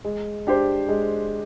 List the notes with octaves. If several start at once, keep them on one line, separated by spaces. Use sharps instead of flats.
G#3
D4 G4 C5
G#3